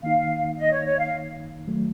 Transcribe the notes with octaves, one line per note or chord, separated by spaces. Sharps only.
D#3 A#3 D#4 F5
D#5
C#5
C#5
F5
D#3 F#3 A3